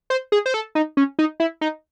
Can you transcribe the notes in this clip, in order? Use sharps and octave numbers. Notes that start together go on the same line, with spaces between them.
C5
G#4
C5
A4
D#4
C#4
D#4
E4
D#4